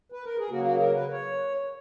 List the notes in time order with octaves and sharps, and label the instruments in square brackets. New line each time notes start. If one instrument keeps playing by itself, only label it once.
[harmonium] B4
A#4
G#4
C#3 F#3 A#3 F#4
F#4
A#4
B4
C#5